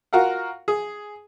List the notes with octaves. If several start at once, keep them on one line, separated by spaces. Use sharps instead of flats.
F4 F#4 A#4 F5 F#5
G#4